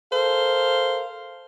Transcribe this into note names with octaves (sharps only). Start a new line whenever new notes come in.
A4 A#4 C5 F5